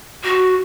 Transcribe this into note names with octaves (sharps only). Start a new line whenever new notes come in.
F#4